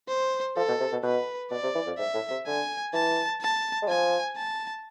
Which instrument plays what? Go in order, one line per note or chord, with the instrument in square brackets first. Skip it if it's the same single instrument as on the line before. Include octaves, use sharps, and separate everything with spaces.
[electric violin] C5
[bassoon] F3 [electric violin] A4
[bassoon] B2
C3
B2
[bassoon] B2 [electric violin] B4
[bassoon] B2 [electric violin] D5
[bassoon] C3
E3
F2
[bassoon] G#2 [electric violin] E5
[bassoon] A2
C3
[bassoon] D3 [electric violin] G#5
[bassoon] E3 [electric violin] A5
[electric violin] A5
[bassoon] G#3
[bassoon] F3 [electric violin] G#5
[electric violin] A5